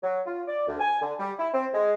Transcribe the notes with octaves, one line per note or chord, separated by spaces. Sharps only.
F#3
F4
D5
D2
G#5
D3
G3
E4
C4
G#3